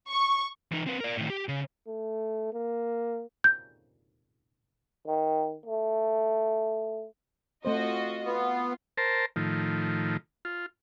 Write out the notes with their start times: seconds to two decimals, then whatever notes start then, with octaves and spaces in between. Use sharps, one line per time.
0.11 C#6
0.72 E3 D#4
0.87 C4 B4
1.00 A#4 D5
1.17 A2 D#3
1.30 G4
1.48 C#3
1.87 A3
2.53 A#3
3.44 G6
5.06 D#3
5.66 A3
7.65 A3 C4 F4 F#4 C5 D#5
8.25 B3 F4
8.98 A#4 C5 A5
9.36 A2 D#3 F3
10.45 F4